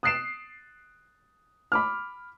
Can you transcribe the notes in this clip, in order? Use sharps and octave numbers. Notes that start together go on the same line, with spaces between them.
D#6 F#6 A6 C7 D7 E7
B5 D6 F6